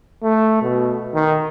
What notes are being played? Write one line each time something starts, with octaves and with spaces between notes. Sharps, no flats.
A3
B2
D#3